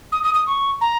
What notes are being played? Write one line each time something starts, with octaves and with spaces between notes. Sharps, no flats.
D#6
D#6
D#6
C#6
A#5